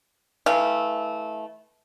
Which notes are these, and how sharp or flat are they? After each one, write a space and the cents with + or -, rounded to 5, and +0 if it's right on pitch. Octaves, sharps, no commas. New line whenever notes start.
E3 -25 A3 -20 F5 -30